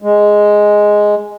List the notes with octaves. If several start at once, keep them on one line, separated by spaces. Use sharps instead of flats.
G#3